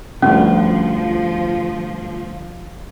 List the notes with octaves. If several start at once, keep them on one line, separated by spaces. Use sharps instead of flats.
G1 D2 F3 C#4